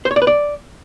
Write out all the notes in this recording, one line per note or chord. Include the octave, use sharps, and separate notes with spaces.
C5
C#5
D5
B4
D5